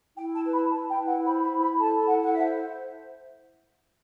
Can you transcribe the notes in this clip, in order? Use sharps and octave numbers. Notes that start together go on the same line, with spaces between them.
E4 G5
A5
B4
B5
B4 A5
G5
E4
F#5
C5 B5
B5
E4
B5
A4 A5
E4 F#5
F#5
C5 E5